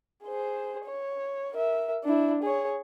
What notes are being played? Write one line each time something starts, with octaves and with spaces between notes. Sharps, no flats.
G#4 C5
C#5
A#4 E5
D4 E4
G#4 C#5